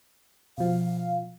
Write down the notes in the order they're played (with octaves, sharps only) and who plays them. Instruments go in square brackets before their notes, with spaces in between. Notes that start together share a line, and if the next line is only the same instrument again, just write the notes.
[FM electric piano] B2 F3 [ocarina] F5